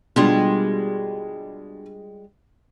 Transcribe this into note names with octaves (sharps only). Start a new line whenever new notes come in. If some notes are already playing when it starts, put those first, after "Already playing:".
B2 D3 G3 G#3 D4 F4